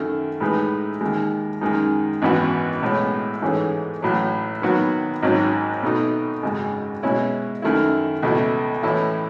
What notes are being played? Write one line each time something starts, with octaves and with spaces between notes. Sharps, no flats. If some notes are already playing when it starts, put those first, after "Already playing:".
Already playing: F#2 D#3 A3
A2 G#3 D#4 G#4 B4
D#2 D#3 G#3
F#2 D#3 G#3 D#4
G#1 F#2 E3 B3 F#4
B1 A2 G#3 C#4
G#2 E3 A3 C#4 G#4
A1 A2 F#3
D#3 F#3 B3 F#4
G#1 G#2 F#3 C#4
B2 A3 D#4
G#1 F#2 C#3 G#3
B2 G#3 C#4 E4
F#2 D#3 A3 E4
C#2 B2 A3 E4
A2 E3 A3 C#4 E4